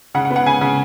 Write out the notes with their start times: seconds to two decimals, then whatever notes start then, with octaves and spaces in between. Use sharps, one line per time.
0.14 C#3 F#5
0.25 F#5
0.30 B3
0.36 F#5
0.46 C#3 G#5
0.61 C#3